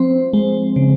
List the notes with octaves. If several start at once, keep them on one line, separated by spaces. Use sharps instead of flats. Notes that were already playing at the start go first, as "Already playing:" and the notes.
Already playing: F3 C4 C5
G#3
C#3